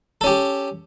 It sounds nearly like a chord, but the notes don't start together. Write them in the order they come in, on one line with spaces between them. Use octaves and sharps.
A4 C#4 G4